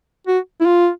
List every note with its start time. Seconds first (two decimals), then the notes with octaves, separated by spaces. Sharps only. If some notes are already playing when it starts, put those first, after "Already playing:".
0.27 F#4
0.61 E4
0.66 F4